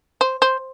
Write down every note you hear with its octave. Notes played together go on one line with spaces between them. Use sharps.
C5
C5